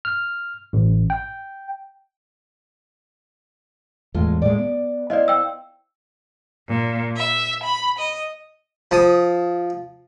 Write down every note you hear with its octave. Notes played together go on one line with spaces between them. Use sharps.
F6
A1
G5
E2 A2 G#3 F4
A2 G#3 D5
B3
E4 C5 D5 D#5 F5
G5 E6
A#2
E5
B5
D#5
F3 D#6